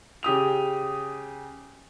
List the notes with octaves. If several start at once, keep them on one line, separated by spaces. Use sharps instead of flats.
C#3 G4 D#6 F7